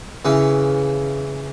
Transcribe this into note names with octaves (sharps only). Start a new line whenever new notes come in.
C#3 E3